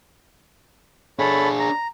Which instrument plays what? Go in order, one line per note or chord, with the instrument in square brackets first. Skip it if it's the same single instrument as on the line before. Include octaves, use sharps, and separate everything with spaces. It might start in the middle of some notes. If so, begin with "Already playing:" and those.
[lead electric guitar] D4 G#4 [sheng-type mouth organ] A4 C#5 B5
[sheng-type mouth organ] A#5